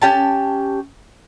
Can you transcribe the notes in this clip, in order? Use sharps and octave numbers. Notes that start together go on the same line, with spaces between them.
C#4 G4 A5